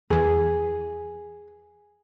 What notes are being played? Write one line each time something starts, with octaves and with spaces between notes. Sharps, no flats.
E2 E3 G#4